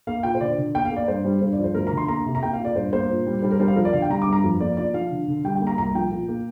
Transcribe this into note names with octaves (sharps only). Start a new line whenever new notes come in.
A#3 F5
A#2 G5
C5
D3 D5
D3
A#3 G5
F5
A#3
D5
G2 C5
G3
G2 C5
D5
F3
C5
D2 A#4
D3 A#5
C6
A#3 A#5
C3
A#5
A#3 G5
F5
A#2
D5
G2 C5
A#3 C5
A#2
G3
G3 C5
A#4
G3 C5
F5
F3 A#4
D5
D3 F5
G5
G3 A#5
D6
G2 A#5
F2
A#3 D5
F3 D5
F3 F5
D3
D3
G3 G5
G5
A#3
A#5
C2 A#5
F3 G5
A#2
A#3